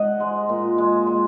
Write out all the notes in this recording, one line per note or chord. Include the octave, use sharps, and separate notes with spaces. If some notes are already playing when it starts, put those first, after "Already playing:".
Already playing: G#2 D#5 F#5
G#3
A#2
G#3
G#3